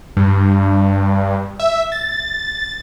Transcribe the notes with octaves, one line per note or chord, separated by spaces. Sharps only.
G2
E5
A6